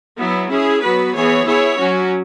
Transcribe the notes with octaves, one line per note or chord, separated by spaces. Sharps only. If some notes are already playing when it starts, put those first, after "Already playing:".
F#3 B3 E4
C#4 E4 G#4
F#3 B3 F#4 B4
E3 B3 G#4 C#5
B3 E4 G#4 C#5
F#3 C#4 F#4